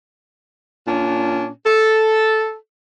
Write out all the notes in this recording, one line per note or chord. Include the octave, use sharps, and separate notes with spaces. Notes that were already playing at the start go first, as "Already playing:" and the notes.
A#2 C#4 D4
A4